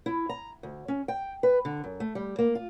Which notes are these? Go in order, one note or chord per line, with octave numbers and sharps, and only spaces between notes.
E4
A#5
D2
C#4
G5
B4
D3
F#2
A3
G3
A#3
F4